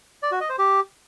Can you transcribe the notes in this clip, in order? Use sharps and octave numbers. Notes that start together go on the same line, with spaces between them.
D5
F#4
D#5
C5
G4